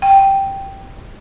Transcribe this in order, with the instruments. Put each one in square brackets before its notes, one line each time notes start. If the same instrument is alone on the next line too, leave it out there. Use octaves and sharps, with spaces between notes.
[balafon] G5